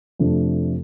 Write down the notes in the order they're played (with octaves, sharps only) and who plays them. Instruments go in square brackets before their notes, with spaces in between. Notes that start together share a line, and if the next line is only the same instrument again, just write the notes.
[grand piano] F2 C3 A3 D4